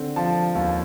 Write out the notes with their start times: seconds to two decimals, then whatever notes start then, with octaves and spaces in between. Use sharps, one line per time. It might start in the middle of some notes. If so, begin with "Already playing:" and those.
Already playing: D3 C4
0.16 F3 A5
0.55 D#2